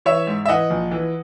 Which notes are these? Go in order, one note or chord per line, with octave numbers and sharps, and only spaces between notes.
E3 C#5 E5
G#2
E5
E3 D#5 F#5
A#1
E3